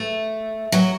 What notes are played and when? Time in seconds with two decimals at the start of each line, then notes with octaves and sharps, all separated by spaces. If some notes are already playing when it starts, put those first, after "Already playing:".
Already playing: A3
0.72 F#3